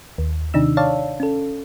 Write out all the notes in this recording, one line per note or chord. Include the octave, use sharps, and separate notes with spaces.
D#2
C3 D#3 D4 D#4 E6
C#5 D5 F5 A5
C#4 A4